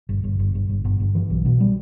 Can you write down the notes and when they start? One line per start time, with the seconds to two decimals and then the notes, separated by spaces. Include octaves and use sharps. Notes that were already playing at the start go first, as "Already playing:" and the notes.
0.09 G1
0.24 G1
0.39 G1
0.55 G1
0.69 G1
0.85 G1
1.00 G1
1.15 E3
1.30 B1
1.45 B2
1.61 G3